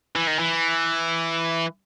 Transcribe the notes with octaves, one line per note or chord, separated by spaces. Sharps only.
E3
D#3
E3